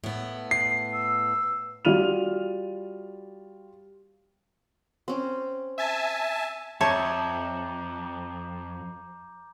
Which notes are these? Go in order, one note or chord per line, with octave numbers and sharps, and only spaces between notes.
A2 B3
C7
E6
G3 F4 F#4 F6 D#7 F7
C4 C#4
E5 G#5 A5
F2 C#5 E5 A5 A#5 D6 G6